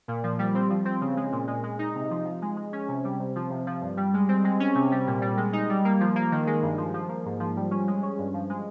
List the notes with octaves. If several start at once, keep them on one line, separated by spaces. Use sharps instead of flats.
A#2
F3
G3
C4
F3
C4
C#3
G#3
A#2
G#3
G#3
D#4
C3
F3
F3
G#3
G#3
C#4
C3
G3
C3
F3
C3
F3
G2
G3
G#3
C4
G#3
C#4
C3
G3
A#2
G3
G#3
D#4
G3
A#3
F3
A#3
D#3
G#3
G2
F3
F3
A#3
G#2
F3
G3
C#4
G#3
C#4
G2
F3
G#3